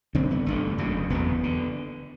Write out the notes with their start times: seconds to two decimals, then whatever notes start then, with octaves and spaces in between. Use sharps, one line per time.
0.15 G1 G2 D3 C4
0.31 B3
0.46 G1 G2 D3 A3
0.78 F#1 E2 B2
1.10 F#1 E2 B2 B3
1.44 D3